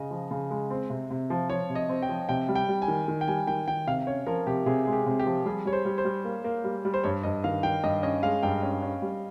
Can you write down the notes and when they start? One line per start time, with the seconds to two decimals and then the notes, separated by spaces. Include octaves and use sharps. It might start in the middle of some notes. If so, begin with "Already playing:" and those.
Already playing: C#3 D#5
0.11 F3
0.31 C#3
0.51 G#3
0.70 C4
0.90 C3
1.11 C3
1.30 F3
1.50 F3 C#5
1.70 C3
1.75 D#5
1.89 C4
2.02 G5
2.09 F3
2.29 C3 G5
2.49 G3
2.55 G5
2.68 G3
2.82 G#5
2.88 D#3
3.08 D#3
3.21 G5
3.28 G3 G#5
3.47 D#3 G5
3.68 D#3 G5
3.87 C3 F5
4.07 C#4 C#5
4.27 F3 A#4
4.47 C3 G4
4.66 C3 G#4
4.85 G#3 G#4
4.93 G4
5.06 C3
5.19 G4
5.26 F3
5.46 G3 G#4
5.65 G3 C#5
5.73 C5
5.85 G3
5.98 C5
6.05 G3
6.25 A#3
6.44 A#3
6.64 G3
6.85 G3
6.94 C5
7.04 G2 C#5
7.23 G2 D#5
7.44 D#3 F5
7.63 D#3 G5
7.83 G2 D#5
8.03 C#4 D#5
8.23 G#3 F5
8.43 G2 G5
8.63 C#4
8.82 C#4
9.02 G3